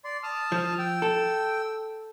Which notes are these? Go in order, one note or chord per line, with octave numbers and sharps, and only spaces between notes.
D5 C6
A5 D#6 F6
F3
G5 E6
A4